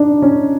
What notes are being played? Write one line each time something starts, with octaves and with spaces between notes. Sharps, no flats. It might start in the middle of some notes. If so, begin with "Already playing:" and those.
Already playing: D4 D#4
C#4